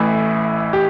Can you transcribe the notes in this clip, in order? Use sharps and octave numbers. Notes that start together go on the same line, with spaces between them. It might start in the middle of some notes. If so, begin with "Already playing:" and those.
Already playing: A1 A2 E3 E4
G4